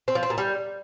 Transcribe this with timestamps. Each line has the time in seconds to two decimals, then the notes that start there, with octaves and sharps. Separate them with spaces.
0.08 C4
0.15 F3
0.23 C4
0.30 A#2
0.38 G3